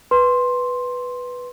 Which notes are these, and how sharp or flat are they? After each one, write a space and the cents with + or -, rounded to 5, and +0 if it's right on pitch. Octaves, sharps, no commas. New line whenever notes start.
B4 +0 C6 +5